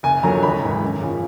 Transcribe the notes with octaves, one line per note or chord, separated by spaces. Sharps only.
F#1 G#5
F2 D3 F#3 A#3 A#5
G#1 B5
G#2 E3
F#2
C#3 F3